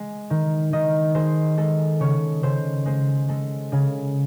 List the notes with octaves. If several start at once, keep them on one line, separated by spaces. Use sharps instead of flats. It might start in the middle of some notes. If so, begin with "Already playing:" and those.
Already playing: G#3 G#5
D#3
D#3 D#5
G#3 C5
G#3 A4
C#3 C#5
C#3 C5
G#3 C5
G#3 A4
C#3 G#4